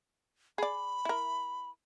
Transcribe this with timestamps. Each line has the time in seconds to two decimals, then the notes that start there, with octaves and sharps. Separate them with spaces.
0.58 G#4 D5 B5
1.05 E4 A#4